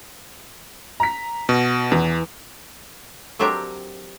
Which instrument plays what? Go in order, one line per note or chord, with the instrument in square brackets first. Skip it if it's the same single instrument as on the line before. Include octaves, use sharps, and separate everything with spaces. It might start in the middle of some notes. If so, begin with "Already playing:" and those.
[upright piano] A#5 B6
[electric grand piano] B2 [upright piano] F#4
[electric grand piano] E2 [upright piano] E3
[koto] F#3 C4 D4 G4 A#4 E5